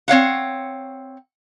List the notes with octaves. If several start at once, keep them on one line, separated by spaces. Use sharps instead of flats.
C4 C#5 F5 F#5